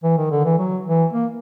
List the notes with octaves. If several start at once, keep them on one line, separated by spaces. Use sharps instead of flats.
E3
D#3
D3
E3
F#3
E3
A#3